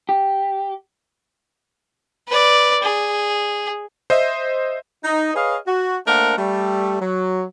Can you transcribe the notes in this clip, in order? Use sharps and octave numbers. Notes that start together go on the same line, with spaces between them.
G4
B4 D5
G#4
C5 D#5 E5
D#4
G#4 B4 C#5 D#5 F5
F#4
A3 A#3 D4 A#4 C5 F#5
G3 A3
F#3